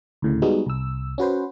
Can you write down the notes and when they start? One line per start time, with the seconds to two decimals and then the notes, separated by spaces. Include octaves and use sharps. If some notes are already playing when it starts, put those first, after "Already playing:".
0.22 D2 A2 C#3
0.42 G3 G#3 B3 D#4 F#4 G#4
0.66 C2 E6
1.18 C#4 F#4 B4 C5